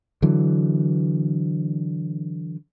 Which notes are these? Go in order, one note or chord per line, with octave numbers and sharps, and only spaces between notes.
D3 E3 F#3